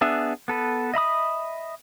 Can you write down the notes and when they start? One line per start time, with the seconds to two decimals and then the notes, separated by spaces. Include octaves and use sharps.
0.01 B3 D4 G#4 E5
0.48 B3 A4 B4
0.94 D#5 E5 B5 D#6